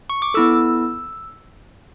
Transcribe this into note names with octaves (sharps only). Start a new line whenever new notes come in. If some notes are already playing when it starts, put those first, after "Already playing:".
C#6
D6
B3 E4 A4 E6